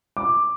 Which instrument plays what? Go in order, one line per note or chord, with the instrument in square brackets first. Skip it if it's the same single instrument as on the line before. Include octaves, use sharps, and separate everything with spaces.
[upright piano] D6